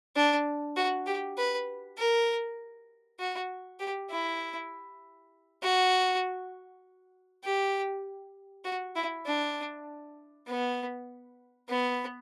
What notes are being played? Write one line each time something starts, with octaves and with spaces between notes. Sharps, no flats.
D4
F#4
G4
B4
A#4
F#4
G4
E4
F#4
G4
F#4
E4
D4
B3
B3